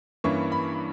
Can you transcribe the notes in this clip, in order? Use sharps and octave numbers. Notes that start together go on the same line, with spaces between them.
G2 E3 A#3 C#4 C#6
B5